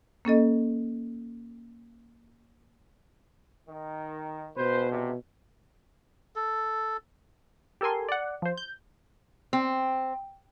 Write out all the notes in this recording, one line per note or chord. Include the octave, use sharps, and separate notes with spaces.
A#3 C#4 A4 D#5
D#3
B2 B4 C5
E2 C3
A4
G4 A4 A#4 G#5 C6
D5 F#5
F3 C5
G6
C4